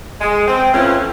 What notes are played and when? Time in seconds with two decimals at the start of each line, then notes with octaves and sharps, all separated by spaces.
0.21 G#3
0.47 C4
0.73 F2 E3 C4 C#4 F4